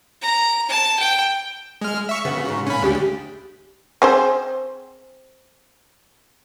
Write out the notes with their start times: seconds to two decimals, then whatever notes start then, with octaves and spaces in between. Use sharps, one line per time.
0.22 A#5
0.69 A5
0.99 G5
1.81 G#3 F6
2.09 E5 C#6
2.25 C#3 B3 F#4
2.45 G#2 F#4
2.67 A#2 C#4 B5
2.82 D2 D4 G4 G#4
4.02 C4 G#4 C5